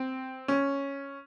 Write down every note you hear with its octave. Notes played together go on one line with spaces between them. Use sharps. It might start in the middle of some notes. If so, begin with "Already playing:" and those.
Already playing: C4
C#4